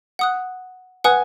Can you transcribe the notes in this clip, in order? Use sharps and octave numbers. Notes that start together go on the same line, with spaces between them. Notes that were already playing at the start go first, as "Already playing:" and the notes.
F#5 D#6 F#6
B4 F#5 G#5 D#6 F#6